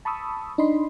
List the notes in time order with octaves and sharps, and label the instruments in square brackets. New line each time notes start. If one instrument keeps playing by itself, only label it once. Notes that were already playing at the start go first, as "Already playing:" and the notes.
[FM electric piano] A5 B5 C#6 D#6 E6
D4 D#4 D#5 B5 C6